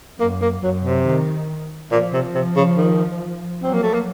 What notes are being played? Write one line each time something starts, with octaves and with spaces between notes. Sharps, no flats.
F#2 A#3
A#3
F#2 F#3
C3
D#3
A#2 F3
C3
C3
C#3
D#3
F#3 C4
A#3
A3
A#3